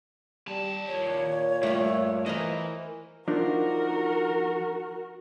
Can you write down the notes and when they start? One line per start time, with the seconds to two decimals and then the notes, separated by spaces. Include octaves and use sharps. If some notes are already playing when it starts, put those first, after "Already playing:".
0.47 D#2 G3 A5
0.88 A#2 C#5
1.63 G2 A3 F4
2.26 E3 A#4 C5 D#5
3.28 F3 D4 D#4 F#4 A#4